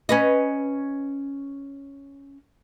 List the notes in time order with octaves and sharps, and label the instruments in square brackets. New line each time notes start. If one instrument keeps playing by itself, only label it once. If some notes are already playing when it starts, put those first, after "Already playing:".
[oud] C#4 B4 D#5